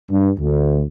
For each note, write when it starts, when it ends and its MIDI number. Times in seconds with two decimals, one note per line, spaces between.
0.11 0.29 43
0.39 0.81 38